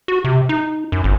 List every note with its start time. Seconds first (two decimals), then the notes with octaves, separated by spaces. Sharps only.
0.08 F#4
0.24 C3
0.49 D#4
0.92 F#2
1.04 G1